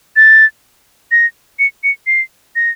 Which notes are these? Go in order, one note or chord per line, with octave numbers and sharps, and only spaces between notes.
A6
A#6
C#7
C#7
C7
A#6